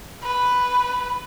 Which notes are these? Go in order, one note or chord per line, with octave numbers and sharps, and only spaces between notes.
B4